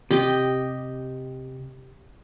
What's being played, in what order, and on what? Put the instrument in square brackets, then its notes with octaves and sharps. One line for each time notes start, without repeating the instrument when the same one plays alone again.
[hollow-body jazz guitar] C3 [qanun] G4 D#5 G5